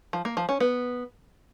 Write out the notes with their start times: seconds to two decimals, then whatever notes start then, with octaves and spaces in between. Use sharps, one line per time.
0.13 F3
0.25 A#3
0.37 F3
0.49 C#4
0.60 B3